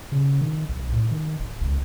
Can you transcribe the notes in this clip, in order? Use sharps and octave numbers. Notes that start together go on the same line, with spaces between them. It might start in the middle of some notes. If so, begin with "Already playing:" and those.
C#3
D#3
B1
A2
D#3
D1
C#2